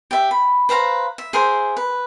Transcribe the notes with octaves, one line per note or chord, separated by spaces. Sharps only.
G4 E5
B5
B4 C5 F5 A#5
E5
G#4 A#4 C5 E5
B4